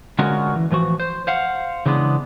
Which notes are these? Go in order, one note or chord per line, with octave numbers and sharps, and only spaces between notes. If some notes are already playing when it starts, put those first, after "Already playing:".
D3 G#3 C#4 F4 F#4 A#4
E3
A2 E3 F3 F#4
C5
C5 F5 F#5
C#3 E3 G#3 B3 D4